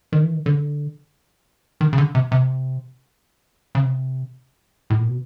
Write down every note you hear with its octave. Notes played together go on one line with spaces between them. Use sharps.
D#3
E3
D#3
D3
D#3
C#3
D3
C3
C3
C#3
C3
A2
A#2
B2